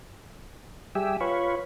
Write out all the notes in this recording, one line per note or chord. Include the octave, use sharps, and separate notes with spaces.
G3 G4 G#4 E5
F4 B4 C#5